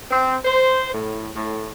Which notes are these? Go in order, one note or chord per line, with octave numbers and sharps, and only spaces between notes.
C4
C5
A2
A2